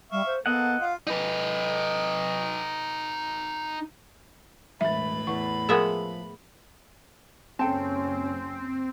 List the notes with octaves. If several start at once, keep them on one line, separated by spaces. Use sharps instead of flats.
G3 E5 F5 C#6
C5
A#3 B3 A4 D#5 F#5
F4 F5
D#4 B4
E1 A2 B4 E5 B5 A6
E2 C#6
F3 G#3 B3 G#4 A#4 E5 F#5
F#1 C4 C#4 A4 G5 A5